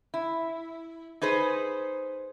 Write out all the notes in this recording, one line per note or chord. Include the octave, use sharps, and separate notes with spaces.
E4
D#4 G#4 B4 C5